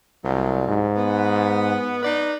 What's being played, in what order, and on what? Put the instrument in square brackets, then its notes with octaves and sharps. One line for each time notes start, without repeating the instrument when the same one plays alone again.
[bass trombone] C2 [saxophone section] F#3 G3
[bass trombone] G#2
[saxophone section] B3
D#4 B4 D5